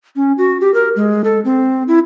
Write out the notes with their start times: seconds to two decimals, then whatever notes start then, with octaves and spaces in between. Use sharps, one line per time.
0.16 C#4
0.38 F#4
0.61 G4
0.74 A#4
0.96 G#3
1.24 A4
1.45 C4
1.88 E4